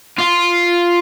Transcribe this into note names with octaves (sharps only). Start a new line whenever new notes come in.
F4